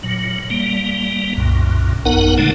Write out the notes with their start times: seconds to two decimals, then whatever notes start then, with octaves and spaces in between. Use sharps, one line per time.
0.03 A#2 F#3
0.50 G3 A#3
1.37 C2 F#2 A#2
2.05 A1 F#2 B3 D#4 A#4 F#5
2.38 A#2 D3 G#3 A3 D#4